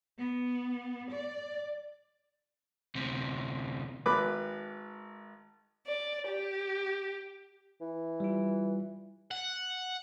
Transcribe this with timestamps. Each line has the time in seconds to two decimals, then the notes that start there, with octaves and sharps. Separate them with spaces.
0.18 B3
1.11 D5
2.95 D2 C3
4.06 G#1 B4 B5 D6
5.87 D5
6.28 G4
7.81 E3
8.20 G3 F4
9.31 F#5